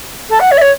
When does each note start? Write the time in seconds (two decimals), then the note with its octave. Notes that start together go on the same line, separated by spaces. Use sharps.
0.29 A4
0.39 F#5
0.51 C#5
0.57 E5
0.61 C#5